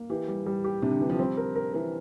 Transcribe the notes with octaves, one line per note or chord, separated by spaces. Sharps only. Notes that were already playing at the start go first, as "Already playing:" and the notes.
Already playing: A#3
E3 G4
G3
G3
G4
C3 D4
D3
E3 D4
F3
G3 C4
A#4
A#4
E3 A#4